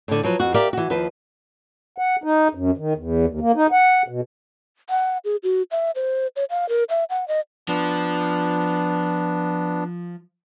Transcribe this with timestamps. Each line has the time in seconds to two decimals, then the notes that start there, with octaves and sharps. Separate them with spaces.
0.08 A2 D3
0.23 F3 F#3 B4
0.39 F2 F#4
0.54 G4 A#4 D5 E5 F5
0.73 E3 F#4
0.90 D#2 F3 B4
1.98 F#5
2.24 D#4
2.55 F#2
2.77 D#3
2.96 E2
3.26 D#2
3.41 A#3
3.56 D#4
3.72 F#5
4.08 B2
4.89 F#5
5.25 G#4
5.43 F#4
5.71 E5
5.95 C5
6.36 C#5
6.50 F5
6.69 A#4
6.89 E5
7.10 F#5
7.28 D#5
7.68 F3 B3 D4